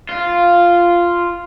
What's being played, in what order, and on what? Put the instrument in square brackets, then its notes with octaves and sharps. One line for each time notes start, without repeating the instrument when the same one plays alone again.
[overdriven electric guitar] F4